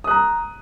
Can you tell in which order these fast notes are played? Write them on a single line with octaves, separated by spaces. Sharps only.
D#6 F#6 A#5